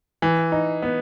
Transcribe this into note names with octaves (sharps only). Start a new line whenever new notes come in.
E3
D#4
B3